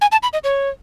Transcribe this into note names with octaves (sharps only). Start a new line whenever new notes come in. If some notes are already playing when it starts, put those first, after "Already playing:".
G#5
A5
B5
D#5
C#5